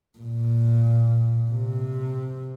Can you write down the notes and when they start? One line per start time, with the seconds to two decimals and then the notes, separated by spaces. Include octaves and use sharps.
0.19 A#2
1.51 C3